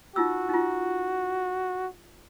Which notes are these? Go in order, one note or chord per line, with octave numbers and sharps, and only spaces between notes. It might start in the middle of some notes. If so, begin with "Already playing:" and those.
D#4 F4 F#4 E6
D#4 F4